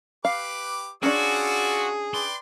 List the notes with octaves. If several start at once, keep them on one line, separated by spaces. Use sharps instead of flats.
G4 B4 F5 D6
C#4 D4 F4 F#4 G#4 D5 E6
B4 D5 G5 C6